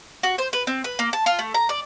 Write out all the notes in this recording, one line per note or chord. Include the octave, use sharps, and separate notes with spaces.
F#4
C5
B4
C4
B4
A#3
A5
F4
A3
A#5
D5